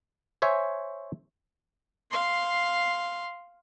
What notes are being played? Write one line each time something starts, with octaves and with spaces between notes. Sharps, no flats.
C5 C#5 E5 G#5
F5 C6